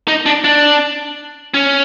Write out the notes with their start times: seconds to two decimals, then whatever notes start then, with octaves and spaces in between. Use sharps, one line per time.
0.08 D#4
0.26 D4
0.44 D4
1.54 C#4